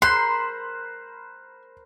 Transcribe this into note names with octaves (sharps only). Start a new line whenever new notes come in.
A#4 C5 B5 C6 F#6